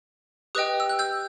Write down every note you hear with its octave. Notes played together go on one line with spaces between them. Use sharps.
G4 B4 D#5 G5 D#6 F#6
E6
F#6
E6 G6